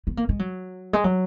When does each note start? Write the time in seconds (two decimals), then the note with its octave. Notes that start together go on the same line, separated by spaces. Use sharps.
0.07 B3
0.17 A#3
0.29 G#3
0.39 F#3
0.93 G#3
1.04 F#3